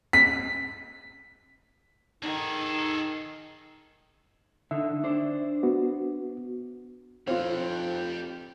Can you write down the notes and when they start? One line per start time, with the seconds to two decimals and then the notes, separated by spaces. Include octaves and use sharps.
0.13 B6
2.23 D#3 D#4 G#4 A4
4.71 D3 D#4 E5
5.04 D4 C5
5.63 B3 F#4
7.27 F2 C4 F4 G4 F5